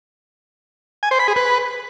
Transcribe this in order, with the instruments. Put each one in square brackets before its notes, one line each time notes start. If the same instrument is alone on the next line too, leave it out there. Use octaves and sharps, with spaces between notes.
[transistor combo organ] G#5
C5
B5
G#4
B4